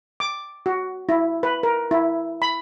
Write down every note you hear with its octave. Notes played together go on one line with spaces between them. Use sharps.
D6
F#4
E4
B4
A#4
E4
B5